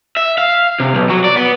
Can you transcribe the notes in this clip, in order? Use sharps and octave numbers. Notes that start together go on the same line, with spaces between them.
E5
F5
C3
B1
F#3
D5
B3